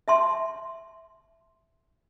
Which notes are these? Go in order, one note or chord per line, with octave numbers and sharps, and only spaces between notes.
E5 A5 C6